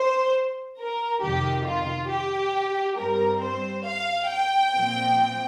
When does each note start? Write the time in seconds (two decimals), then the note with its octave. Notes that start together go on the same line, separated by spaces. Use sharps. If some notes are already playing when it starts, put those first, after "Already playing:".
Already playing: C5
0.79 A#4
1.22 F2 C3 D#3 G4
1.66 F4
2.11 G4
2.98 G2 G3 C4 A#4
3.42 C5
3.87 F5
4.31 G5
4.75 A#2 F3 C4